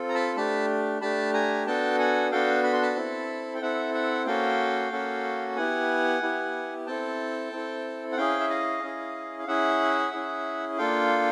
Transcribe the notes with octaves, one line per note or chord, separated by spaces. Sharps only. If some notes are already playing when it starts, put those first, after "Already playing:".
Already playing: C4 F4 A4
A#5
A5 B5
A3 D4 G4 A5 B5
A3 D4 G4 A5 B5
G#5 A#5
B3 D4 F#4 A4 G5 A5
F#5 G#5
B3 D4 F#4 A4 F5 G5
B5
C6
A5 B5
C4 E4 A4
G5
C4 E4 A4 E5 F#5
E5 F#5
A#3 C#4 F#4 A4 F5 G5
A#3 C#4 F#4 A4
B3 E4 G4 F#5 G#5
B3 E4 G4
C4 E4 A4 G5 A5
C4 E4 A4
F#5
C#4 E4 G#4 F5 G5
E5
D#5 F5
C#4 E4 G#4
F5
C#4 E4 G#4 E5 F#5
C#4 E4 G#4
A#3 D4 F4 A4 F5 G5